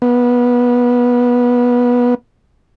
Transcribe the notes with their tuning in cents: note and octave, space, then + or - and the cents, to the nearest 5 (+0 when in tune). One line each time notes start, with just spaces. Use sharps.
B3 -20